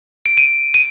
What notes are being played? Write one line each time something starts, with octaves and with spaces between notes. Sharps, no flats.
D7
D#7
D#7